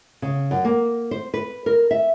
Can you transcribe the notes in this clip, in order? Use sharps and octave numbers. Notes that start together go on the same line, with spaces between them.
C#3
F#2
A#3
C5
B4
A#4
E5